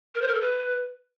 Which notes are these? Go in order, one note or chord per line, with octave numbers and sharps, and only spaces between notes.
A#4
C5
A#4
A4
B4